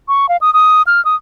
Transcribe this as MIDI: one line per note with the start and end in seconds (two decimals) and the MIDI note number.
0.08 0.29 85
0.29 0.37 77
0.41 0.53 87
0.54 0.82 87
0.87 1.03 89
1.05 1.16 87